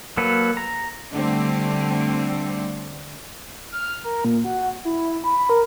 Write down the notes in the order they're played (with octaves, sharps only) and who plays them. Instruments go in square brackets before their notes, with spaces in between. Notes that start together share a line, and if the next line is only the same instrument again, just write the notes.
[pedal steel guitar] F#3 A#3 A4 B4
A#5
[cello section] D3 G3 A3 C4
[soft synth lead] F6
A#4
A#2
F#4
E4
B5
A#4